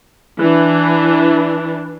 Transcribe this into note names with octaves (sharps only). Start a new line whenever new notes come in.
E3 D4